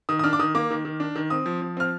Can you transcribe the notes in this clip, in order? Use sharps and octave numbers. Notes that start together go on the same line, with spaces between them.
D#3 D#6
D#6
D4 F6
D6
D#3 D#6
A#3 D6
D#3
D#3
D4
D#3
C4 D#6
F3
F3
C4 F6